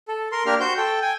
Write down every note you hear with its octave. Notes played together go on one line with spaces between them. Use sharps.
A4
A#4 C6
A#3 D4 G4 A#4 F6
F#4 C5 G6
A4 G5
G5 G#5